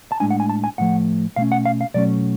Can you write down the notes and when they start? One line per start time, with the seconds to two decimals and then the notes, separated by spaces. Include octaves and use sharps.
0.12 A5
0.20 A2 G#3 D4 G#5
0.30 F#5
0.40 G#5
0.49 A5
0.64 G#5
0.78 A2 F3 A3 F#5
1.36 B2 A3 C#4 F5
1.52 F#5
1.66 F5
1.81 F5
1.94 B2 F#3 A3 C#4 D5